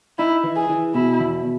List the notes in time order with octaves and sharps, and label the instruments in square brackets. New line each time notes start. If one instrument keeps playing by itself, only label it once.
[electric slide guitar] D#4 [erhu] E4
[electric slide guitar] E3
[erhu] G#4
[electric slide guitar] E3
[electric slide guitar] B2 [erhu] E4
[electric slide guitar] E2